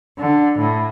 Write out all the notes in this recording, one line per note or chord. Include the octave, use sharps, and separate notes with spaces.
D3
A2